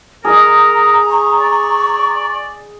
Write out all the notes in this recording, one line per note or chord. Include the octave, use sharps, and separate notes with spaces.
G#4 A#4 D#5 A#5
C#6
D5